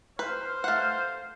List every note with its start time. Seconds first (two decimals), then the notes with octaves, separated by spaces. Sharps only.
0.19 B4 C5 F6
0.64 A3 F5 F#5